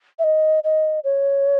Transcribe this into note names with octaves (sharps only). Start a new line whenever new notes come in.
E5
D#5
D#5
C#5